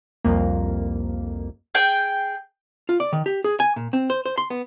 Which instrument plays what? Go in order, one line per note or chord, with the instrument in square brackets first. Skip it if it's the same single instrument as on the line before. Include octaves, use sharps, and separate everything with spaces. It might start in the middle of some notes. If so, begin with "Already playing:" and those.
[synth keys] C2 F2 A#3
[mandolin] G#4 G5
[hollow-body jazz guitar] F4
D5
D#3
G4
G#4
G#5
A#2
C4
C5
C5
C6
B3